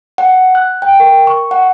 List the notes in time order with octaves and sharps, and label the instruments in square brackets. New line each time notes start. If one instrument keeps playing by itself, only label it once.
[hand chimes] F#5
F#6
G5
A#4
C#6
F#5